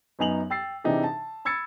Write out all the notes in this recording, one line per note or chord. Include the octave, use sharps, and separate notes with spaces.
F#2 B3 D#4 G#5 F7 F#7
G5 E6 A6 C7
C3 E3 D4 D#4 G4 G#4
A5
B5 E6 G#6 A6 C#7